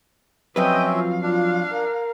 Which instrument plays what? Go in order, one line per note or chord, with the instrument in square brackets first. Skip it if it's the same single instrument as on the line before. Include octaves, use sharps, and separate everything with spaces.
[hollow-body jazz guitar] F2 F#3 B4 [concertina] C4 C#4 E5 [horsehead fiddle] D#5 G5
[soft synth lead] F4 [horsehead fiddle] F5
[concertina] D4 [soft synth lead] F4
[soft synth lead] A#4